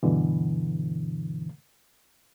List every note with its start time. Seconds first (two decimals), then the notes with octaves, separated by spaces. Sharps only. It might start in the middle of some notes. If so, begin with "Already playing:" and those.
0.03 G2 B2 D3 E3